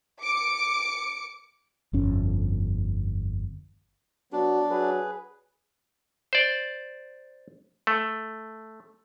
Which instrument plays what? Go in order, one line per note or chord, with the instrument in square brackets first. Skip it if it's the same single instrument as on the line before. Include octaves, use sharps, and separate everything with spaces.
[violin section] D6 C#7 D7
[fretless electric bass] G1 F2 C#4
[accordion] F#3 B3 [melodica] D4 [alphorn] F#4
[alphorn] F#3 [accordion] G#4 B4
[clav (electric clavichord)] C5 D5
A3